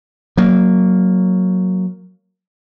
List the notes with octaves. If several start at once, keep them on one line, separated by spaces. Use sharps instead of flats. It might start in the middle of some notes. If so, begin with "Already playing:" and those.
F#3 A#3